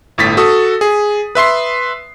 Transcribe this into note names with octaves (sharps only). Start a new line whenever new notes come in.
G1 A2 A6 B6
F#4 A4 D#6
G#4
B4 E5 C6 C7